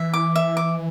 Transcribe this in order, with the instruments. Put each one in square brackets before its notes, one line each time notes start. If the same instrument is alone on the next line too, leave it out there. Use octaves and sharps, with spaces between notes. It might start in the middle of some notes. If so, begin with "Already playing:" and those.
Already playing: [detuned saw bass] E3 [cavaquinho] E5
[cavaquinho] D6
E5
D6